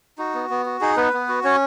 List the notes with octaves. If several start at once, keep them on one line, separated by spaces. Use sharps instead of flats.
D#4 F#4
B3
B3
F#4
D#4 G#4
B3 B4
B3
F#4
C#4 C#5